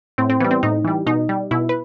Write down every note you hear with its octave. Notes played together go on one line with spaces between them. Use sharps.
A2 C4
C4
E3 G3 B3
C4
A2 D#4
E3 G3
B2 D#4
G3
B2 E4
B4